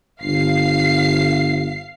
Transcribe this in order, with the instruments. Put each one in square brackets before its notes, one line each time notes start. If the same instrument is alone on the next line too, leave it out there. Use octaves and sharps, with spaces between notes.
[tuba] G1 [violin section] F5 C7